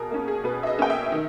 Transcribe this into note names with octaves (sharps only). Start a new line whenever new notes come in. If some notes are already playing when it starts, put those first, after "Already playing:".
Already playing: B2 G#4 A#4
A#3 C#4
G#4
B2 B4
E5
D#5
A#3 C#4 G5
E5
D#3